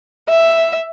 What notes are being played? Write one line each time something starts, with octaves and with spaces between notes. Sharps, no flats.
E5